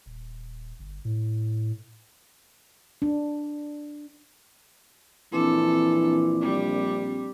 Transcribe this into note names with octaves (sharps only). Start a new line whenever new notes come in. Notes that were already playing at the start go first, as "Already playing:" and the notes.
D#1
G1
A2
D4
A#1 E3 C4 D4 A4 D6
G3